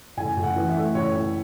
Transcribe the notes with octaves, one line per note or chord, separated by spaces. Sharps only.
A2 G#5
A2
F#5
E3 F#5
E5
A3
A2 C#5
A2